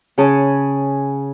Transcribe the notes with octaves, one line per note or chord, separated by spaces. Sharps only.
C#3 C#4 G#4 A5